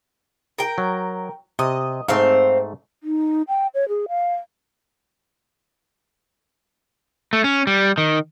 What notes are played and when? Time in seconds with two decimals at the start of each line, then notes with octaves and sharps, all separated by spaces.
0.58 A#4 G5
0.78 F#3
1.59 C3 D#5
2.08 G#2 A3 C4 C5 F5
3.03 D#4
3.48 G5
3.74 C#5
3.88 G#4
4.09 F5
7.33 A3
7.44 C#4
7.67 G3
7.98 D#3